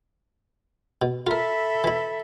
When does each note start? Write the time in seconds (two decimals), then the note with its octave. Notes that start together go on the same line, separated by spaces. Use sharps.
1.02 B2
1.27 F4 A4 A#4 E5 B5
1.84 E3 E4